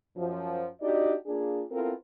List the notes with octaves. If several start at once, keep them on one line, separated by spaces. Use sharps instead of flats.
F#2 F3
D4 D#4 F#4 G4 D5 D#5
A#3 D4 F4 G#4
B3 C4 E4 F4 A4 A#4